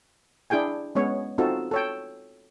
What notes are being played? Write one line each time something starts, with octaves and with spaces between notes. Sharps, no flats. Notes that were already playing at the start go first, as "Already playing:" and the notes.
D4 E4 G#4 G5 G#5
G#3 B3 C#4 C#5
C4 D#4 F4 F#4 A4
A4 C#5 G5